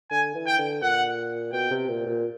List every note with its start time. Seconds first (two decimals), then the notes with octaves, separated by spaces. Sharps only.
0.11 D3 G#5
0.35 E3
0.47 G5
0.58 D3
0.82 A#2 F#5
1.53 B2 G5
1.71 C3
1.89 A#2
2.06 A#2